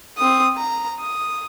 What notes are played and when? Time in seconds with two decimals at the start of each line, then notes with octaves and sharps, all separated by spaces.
0.17 C4 D#6
0.57 A#5
0.99 D#6